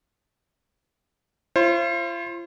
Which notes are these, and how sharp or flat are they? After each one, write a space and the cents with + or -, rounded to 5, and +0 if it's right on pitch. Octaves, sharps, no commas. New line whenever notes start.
F4 -40 C5 +30